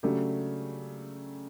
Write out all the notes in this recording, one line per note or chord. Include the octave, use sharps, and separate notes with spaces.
C#3 F#3 A3 D4 G4